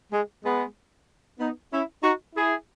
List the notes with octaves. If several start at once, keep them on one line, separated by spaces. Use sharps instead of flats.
G#3
G#3 B3
B3 D#4
C#4 E4
D#4 F#4
E4 G#4